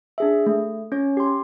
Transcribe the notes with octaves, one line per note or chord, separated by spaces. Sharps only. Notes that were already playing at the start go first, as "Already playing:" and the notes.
D4 G#4 E5
A3
C#4 C#5
G4 C6